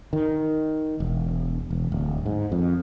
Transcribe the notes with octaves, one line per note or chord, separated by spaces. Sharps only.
D#3
E1
E1
D1
G#2
F2